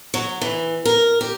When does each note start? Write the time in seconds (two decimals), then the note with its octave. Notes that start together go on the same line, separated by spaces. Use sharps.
0.14 F#3
0.41 E3
0.85 A#4
1.21 G4